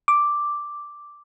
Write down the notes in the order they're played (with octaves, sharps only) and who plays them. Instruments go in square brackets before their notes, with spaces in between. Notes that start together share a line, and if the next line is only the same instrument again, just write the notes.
[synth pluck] D6